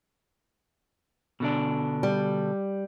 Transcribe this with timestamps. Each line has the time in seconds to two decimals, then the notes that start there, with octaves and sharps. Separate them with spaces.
1.40 B2 D3 D4
2.03 G3